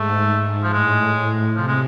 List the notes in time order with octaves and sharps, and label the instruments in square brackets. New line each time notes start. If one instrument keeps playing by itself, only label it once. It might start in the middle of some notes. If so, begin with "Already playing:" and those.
Already playing: [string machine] G#2 [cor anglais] A3
[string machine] G#2
[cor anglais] F3
[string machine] A2 [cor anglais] G#3
[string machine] C3 [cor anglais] F3
[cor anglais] G#3